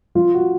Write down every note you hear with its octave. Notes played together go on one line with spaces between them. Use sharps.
F3 F4
F#4